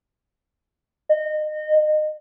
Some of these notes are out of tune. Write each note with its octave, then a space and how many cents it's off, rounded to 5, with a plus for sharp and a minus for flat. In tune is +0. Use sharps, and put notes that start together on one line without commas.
D#5 -25